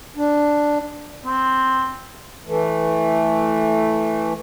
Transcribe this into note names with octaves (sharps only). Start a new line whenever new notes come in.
D4
C4
E3 A3